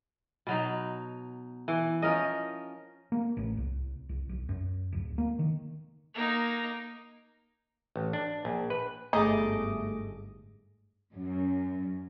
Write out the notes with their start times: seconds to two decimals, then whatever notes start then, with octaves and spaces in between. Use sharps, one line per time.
0.47 B2 F#3 D#4
1.68 E3
2.02 F3 C#4 A#4 D#5
3.12 A#3
3.37 A1
3.57 C2
4.09 C2
4.29 B1
4.49 F#2
4.92 D1
5.18 A#3
5.39 D#3
6.15 A#3 D#4
7.96 A1
8.13 D4
8.45 A#1
8.70 B4
9.13 G1 G#2 A3 D#4 G#4 D#5 D6
11.13 F#2